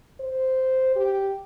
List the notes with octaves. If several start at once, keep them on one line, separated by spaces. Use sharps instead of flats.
C5
G4